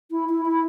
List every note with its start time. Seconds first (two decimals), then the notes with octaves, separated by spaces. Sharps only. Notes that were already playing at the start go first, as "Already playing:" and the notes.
0.11 E4
0.29 E4
0.45 E4